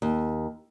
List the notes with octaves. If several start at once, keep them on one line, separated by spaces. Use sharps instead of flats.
D#2